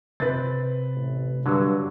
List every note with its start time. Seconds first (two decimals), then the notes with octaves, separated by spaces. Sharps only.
0.20 C3 C4 B4 A6
0.95 A1
1.46 G2 D3 F#3